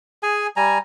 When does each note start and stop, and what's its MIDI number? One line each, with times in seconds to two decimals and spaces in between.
0.23 0.47 68
0.23 0.47 80
0.56 0.78 55
0.56 0.78 80
0.56 0.78 82